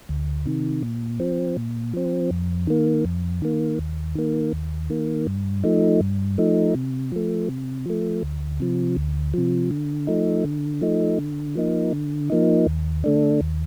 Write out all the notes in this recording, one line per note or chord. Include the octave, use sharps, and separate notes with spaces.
D2
C3 D#3
A#2
F3 C4
A#2
F3 C4
F2
D#3 A#3
F2
D#3 A#3
D#2
D#3 A#3
D#2
D#3 A#3
G2
F3 A3 D#4
G2
F3 A3 D#4
C3
F3 A3
C3
F3 A3
D2
C3 F3
D2
C3 F3
D3
F3 A3 D#4
D3
F3 A3 D#4
D3
F3 A#3 D#4
D3
F3 A#3 D#4
D#2
D3 A3 D4
D#2